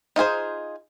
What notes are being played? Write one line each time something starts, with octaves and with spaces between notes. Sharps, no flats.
D#4 F4 G#4 C5